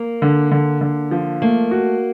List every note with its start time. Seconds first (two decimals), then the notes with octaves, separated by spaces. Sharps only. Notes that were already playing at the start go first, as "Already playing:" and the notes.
Already playing: A#3
0.22 D3
0.51 D3
0.81 D3
1.11 F3
1.42 A3 A#3
1.71 F#4